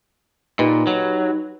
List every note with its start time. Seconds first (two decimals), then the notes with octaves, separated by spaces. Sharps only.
0.59 A#2 D#4 G4 B4
0.87 F#3